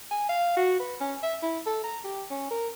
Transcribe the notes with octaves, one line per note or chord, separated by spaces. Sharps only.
G#5
F5
F#4
B4
C#4
E5
E4
A4
A#5
G4
C#4
A#4